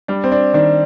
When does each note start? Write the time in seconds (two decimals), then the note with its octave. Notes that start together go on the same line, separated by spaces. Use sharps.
0.08 G3 D4
0.24 C4
0.31 D4
0.54 D#3 D4